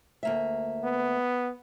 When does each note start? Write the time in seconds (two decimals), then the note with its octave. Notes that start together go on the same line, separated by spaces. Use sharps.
0.23 D2 A#3 E5
0.84 B3